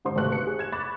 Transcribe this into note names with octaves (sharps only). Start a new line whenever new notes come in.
G#2 D3 C5 C6
G#1 C3 A3 B4 C#6 F#6
C#7
G#4
G#6 E7
B5 C#6 D6 F#6 A6